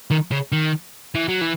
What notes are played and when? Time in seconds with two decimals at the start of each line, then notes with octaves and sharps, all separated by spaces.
0.11 D#3
0.31 C#3
0.52 D#3
1.15 E3
1.28 F#3
1.41 E3